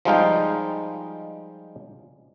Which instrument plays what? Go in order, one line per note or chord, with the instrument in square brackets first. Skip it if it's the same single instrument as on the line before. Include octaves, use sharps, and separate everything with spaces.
[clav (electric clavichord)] F3 G3 G#3 D#4 F5 G5